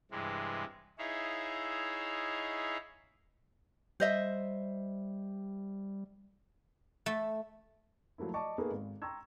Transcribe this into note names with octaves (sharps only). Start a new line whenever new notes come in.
G2 C3 E3 G#3
D#4 E4 G#4 C#5 E5 F5
G3 C5 D#5 E5
A3
F3 F#3 A3 A#3 E4
D5 D#5 A5 C#6 D6
A#3 B3 D#4 G#4 A4 B4
G#1
G5 A#5 C6 C#6 E6 G#6